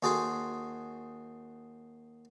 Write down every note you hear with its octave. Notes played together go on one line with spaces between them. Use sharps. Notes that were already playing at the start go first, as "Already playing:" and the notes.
D#2 F#4 G#4 A4 C5 G5